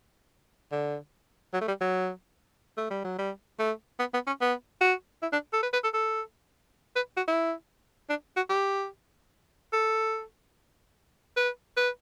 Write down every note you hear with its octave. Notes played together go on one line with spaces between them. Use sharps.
D3
F#3
A3
G3
F#3
A3
G3
F#3
G3
A3
B3
B3
C#4
B3
F#4
E4
D4
A4
B4
B4
A4
A4
B4
F#4
E4
D4
F#4
G4
A4
B4
B4